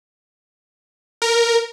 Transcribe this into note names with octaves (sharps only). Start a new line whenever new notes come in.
A#4